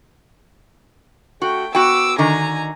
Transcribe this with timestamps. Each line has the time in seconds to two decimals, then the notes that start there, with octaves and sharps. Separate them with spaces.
1.42 A3 F#4 G5
1.75 B3 F#4 G5 D6 E6
2.18 D3 D#3 G#5 A#5